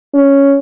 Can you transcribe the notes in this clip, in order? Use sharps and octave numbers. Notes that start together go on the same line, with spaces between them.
C#4